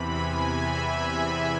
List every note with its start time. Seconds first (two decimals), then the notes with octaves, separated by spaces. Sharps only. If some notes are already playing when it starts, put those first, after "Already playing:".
Already playing: E2 C3 E3 B5
0.11 G#5
0.53 E5